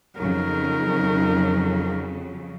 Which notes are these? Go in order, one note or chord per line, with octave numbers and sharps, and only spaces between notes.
F2 C#3 F#3 D#4 A#4